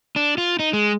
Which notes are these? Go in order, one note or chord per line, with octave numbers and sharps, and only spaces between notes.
D4
F4
D#4
G#3